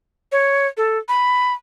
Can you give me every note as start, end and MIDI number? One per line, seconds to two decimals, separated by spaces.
0.32 0.67 73
0.77 0.98 69
1.08 1.53 83